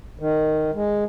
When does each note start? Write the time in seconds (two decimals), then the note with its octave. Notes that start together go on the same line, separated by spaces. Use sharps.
0.19 D#3
0.74 G#3